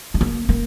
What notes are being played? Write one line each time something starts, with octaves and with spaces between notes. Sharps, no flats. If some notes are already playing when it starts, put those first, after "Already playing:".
A3
A#3
A#3